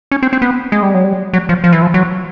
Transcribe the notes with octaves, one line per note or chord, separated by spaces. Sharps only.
C#4
C4
C4
B3
G#3
G3
F#3
G3
F#3
F3
F3
E3
F3
F#3